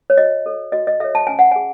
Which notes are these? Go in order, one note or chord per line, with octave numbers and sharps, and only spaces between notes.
C#5
F#4 D#5
A4 C#5
F#4 D#5
D#5
A4 C#5 E5
A5
C#4 G#5
F#5
G#4 G#5